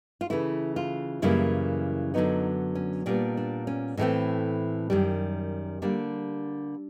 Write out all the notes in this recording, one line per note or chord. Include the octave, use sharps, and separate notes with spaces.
F4
C#3 E3 A3 E4
F4
F#2 C#3 E3 G3 A#3 E4
F#2 D3 F#3 B3 D#4
C#4
A#2 G3 B3 D4
D4
C#4
A2 E3 A3 C4 D#4
F#2 D#3 G3
D3 G3 A#3 D4